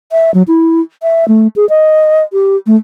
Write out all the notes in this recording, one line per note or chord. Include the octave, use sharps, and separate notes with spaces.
E5
F#3
E4
E5
A3
G#4
D#5
G4
A3